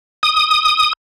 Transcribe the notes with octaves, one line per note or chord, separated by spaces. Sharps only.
D#6